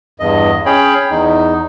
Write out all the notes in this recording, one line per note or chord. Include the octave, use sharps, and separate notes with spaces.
E2 G2 D#5
C#4 G#4 C#5 G5 B5
E2 D#4